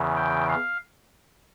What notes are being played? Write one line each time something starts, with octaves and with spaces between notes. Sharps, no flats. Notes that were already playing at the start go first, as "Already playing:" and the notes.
Already playing: E2 C#3 E3
G5
F5